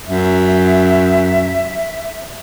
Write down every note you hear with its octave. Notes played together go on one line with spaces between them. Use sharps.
F#2 E5